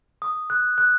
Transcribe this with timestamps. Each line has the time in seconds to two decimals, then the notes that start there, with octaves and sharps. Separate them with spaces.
0.22 D#6
0.50 F#6
0.78 F#6